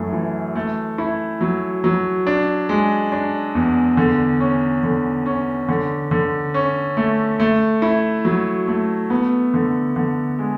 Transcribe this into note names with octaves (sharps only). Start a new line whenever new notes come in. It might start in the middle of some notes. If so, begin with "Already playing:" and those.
Already playing: F#2 E3 A3
E3
A3
E4
F#3
F#3
D4
G#3
D4
E2
D3
C#4
D3
C#4
D3
D3
C#4
A3
A3
E4
F#3
A3
B3
D3
D3
G#3